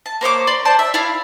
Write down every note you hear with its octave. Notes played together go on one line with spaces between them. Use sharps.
A5
A#3 C5 C#5 D6
D5 B5 C6
C5 D5 A5
E5
E4 D5 F5